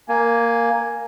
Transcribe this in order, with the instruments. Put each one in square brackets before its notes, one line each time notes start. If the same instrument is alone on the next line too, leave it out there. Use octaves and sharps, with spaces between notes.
[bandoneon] A#3 [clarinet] G#5